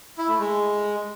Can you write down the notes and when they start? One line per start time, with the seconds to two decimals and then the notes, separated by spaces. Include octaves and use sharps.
0.18 E4
0.29 A3
0.39 G#3